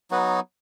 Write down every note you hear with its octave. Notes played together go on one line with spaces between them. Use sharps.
F#3 B3 D#4 F#4 B4